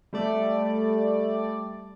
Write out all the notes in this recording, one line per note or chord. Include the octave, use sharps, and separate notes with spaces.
G3 A3 D5